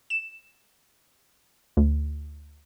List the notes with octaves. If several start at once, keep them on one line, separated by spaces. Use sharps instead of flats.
E7
D2